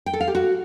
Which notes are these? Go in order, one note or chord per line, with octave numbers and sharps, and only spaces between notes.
G5
A4
F5
G4
F#4